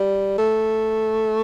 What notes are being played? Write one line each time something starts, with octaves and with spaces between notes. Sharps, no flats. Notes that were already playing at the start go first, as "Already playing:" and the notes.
Already playing: G3
A3